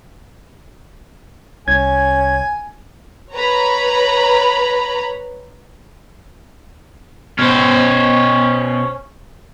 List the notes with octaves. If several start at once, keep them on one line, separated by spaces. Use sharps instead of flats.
C2 C#4 G#5 G#6
B4 C#5 A#5 B5
B2 C#4 C5